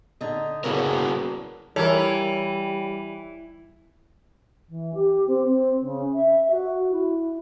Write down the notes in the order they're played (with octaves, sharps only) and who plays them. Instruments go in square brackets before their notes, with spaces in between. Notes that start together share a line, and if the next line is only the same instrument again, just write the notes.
[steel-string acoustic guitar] D3 D#4
[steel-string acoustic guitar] C#3 B3 D4 [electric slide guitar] E4 F#4 A#4
[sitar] E3 [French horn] G3 [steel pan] A4 A#4 [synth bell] C#5
[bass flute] E3
G4
C4
C4
C#3
E5
F#4
E4